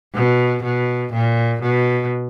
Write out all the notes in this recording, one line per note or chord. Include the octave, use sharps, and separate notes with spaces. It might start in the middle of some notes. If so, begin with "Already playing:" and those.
B2
B2
A#2
B2